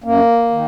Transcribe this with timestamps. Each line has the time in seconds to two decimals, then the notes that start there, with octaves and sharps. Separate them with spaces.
0.04 F#2 A#3
0.51 D#3